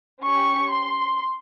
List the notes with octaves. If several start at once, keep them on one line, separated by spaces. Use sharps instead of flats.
C#4 G4 C#6
C6